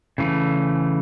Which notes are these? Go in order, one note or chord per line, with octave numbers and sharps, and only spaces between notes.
C#3 E3 A3